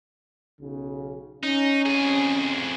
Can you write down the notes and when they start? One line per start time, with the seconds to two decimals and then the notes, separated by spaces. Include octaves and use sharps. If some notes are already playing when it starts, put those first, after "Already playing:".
0.61 B1 C#3
1.43 C#4 D#4
1.86 F2 G#4